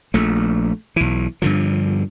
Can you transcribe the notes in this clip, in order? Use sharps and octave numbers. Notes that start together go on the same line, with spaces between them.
A#1 A3
B1 E3
G2 D3 F3